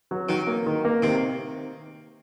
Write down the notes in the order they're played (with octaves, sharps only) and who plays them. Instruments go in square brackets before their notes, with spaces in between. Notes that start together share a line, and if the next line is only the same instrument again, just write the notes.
[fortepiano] F#3
[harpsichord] D#3 [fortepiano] F#3
[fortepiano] A#3
D#3
A#3
[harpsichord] C3 [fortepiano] D#3